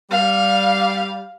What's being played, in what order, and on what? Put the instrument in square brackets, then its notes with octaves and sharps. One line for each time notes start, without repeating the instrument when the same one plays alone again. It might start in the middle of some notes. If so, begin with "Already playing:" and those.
[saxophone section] G3 [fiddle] F5